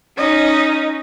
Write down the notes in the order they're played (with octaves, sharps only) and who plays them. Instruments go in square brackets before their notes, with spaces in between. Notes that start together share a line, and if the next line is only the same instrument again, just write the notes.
[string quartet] C#4 D#4 [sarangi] D#5